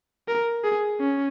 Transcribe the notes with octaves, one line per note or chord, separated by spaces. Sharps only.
A#4
G#4
C#4